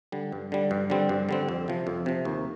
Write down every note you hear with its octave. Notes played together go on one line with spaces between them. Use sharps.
D3 G3
G2
D3 G3
G2
D3 G3 C4
G2
D3 G3 C4
F2
C3 F3
F2
C3 F3
D#2